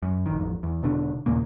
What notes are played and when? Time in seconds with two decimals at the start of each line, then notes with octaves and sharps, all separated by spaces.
0.03 F#2
0.26 A1 D#3
0.39 A1 F2
0.63 E2
0.83 E1 B2 D3 D4
1.26 D#2 A#2 C#3 A#3